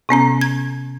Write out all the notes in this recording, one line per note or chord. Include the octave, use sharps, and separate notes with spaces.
C3 B3 C#4 A#5
G#6